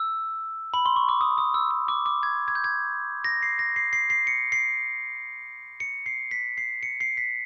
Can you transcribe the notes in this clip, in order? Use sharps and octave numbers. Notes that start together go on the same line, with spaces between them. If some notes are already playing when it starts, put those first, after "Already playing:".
Already playing: E6
B5
C6
C#6
D6
D#6
D#6
E6
E6
D6
D6
G#6
G#6
G6
G#6
A#6
C7
A#6
C7
C7
C7
C#7
C7
C#7
C7
B6
C7
C#7
C7
B6